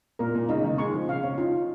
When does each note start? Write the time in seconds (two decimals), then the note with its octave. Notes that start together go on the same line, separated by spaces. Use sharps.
0.19 A#2 A#4
0.35 A#2
0.49 C#3 D#4
0.64 D#3
0.78 G#3 C#6
0.94 F3
1.09 C#3 F5
1.23 C#4
1.38 D#4 F4